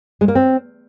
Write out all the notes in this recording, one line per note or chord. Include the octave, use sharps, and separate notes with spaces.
G#3
A#3
C4